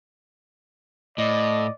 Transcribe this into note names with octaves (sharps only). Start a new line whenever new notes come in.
A2 D5 D#5